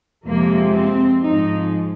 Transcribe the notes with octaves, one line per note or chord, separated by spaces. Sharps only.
F2 C3 F3 G#3 A#3
C4
G#2 F3 G#3 D#4